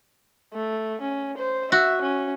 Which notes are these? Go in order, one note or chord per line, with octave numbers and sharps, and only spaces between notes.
A3
C#4
C5
F#4 E5
C#4